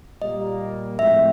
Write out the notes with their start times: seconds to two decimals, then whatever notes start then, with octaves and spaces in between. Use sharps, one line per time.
0.22 A#2 G3 A#3 D#5
0.99 A2 F3 G#3 C4 E5